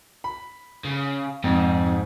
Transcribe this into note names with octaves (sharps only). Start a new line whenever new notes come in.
B5
C#3
F2 G#2